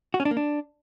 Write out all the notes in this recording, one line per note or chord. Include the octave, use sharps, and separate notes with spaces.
F#4
C#4
D4
A#3
D4